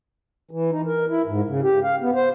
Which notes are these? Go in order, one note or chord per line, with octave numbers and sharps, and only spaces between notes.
E3
D#4
A#4
E4
G#2
C#3
G4
F5
B3
C5